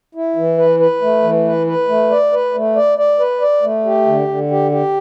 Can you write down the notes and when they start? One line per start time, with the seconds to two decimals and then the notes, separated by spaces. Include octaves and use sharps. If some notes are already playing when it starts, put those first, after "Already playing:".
0.15 E4
0.36 E3
0.58 B4
0.80 B4
1.02 A3
1.23 E3
1.46 B4
1.67 B4
1.88 A3
2.11 D5
2.32 B4
2.54 A3
2.76 D5
2.98 D5
3.19 B4
3.41 D5
3.62 A3
3.85 G4
4.07 D3
4.28 D3
4.51 G4
4.71 G4